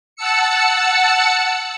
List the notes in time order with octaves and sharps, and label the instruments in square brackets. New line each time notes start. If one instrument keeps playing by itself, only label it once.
[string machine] F#5 A5 E6 C#7